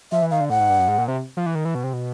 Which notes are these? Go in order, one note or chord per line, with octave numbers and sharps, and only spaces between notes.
F3 E5
E3
D#3 F5
D3
A2 F#5
G#2
G2
F#2
G#2
A#2
C3
F3
E3
D#3
E3
B2
C3
B2